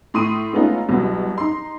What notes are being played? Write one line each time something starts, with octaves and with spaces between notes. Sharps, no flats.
A2 C6 D#6 D#7
G#3 A3 B3 C#4 D#4 F4
C2 B2 F#3 B3
D#4 C6